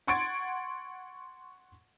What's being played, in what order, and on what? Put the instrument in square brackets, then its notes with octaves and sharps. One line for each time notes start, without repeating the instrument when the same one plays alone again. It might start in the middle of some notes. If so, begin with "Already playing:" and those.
[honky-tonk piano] F#5 C6 C#6 G#6 A6 D7